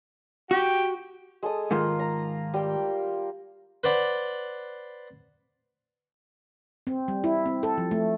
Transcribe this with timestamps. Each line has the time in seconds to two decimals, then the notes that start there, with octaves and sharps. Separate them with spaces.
0.51 F#4 G4
1.43 G#3 A4 D#6
1.71 G#2 D#3 A#3 F4
1.99 A#5
2.54 G3 G5
3.84 B4 C5 D5 F#5 B5
6.87 C4
7.08 G3
7.24 E4
7.46 C4
7.63 A4
7.78 F3
7.91 A3